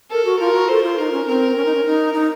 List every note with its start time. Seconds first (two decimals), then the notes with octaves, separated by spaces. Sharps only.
0.11 A4 A#4
0.25 F#4
0.40 F4 A#4
0.54 F#4
0.69 A4 C5
0.83 F4
0.98 D#4 A#4
1.12 C#4
1.27 C4 A#4
1.57 C#4
1.65 D#4
1.76 C#4
1.86 D#4
2.14 D#4